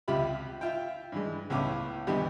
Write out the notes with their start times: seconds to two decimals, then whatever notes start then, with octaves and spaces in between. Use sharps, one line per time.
0.08 C#2 C3 F4 G4 E5 B5
0.61 F4 E5 F5 G5
1.12 G2 E3 G#3
1.50 C#2 A2 B3 C#4 F5 D6
2.07 D2 G2 E3 B3 G4 D#5